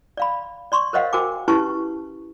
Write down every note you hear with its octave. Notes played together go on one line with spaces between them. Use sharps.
D5 F5 B5
D5 C6 C#6
A#4 C5 C#5 D#5 F5 F#5
F#4 A#4 C5 G5 G#5 D6
C#4 E4 G4 B4 A5 C#6